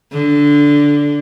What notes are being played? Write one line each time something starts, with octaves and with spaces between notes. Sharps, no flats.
D3